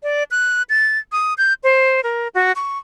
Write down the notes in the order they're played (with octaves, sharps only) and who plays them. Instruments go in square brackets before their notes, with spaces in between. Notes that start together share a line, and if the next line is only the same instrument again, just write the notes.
[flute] D5
F#6
A6
D#6
G6
C5
A#4
F#4
C#6